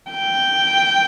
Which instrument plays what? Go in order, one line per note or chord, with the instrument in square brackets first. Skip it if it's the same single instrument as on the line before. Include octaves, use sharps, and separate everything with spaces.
[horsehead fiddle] G5